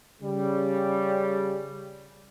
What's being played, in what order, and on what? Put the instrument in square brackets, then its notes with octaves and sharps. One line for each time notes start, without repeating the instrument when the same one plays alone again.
[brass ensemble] C#3 G3